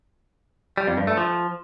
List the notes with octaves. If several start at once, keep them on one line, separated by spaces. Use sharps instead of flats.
G3
F2
G2
A3
F3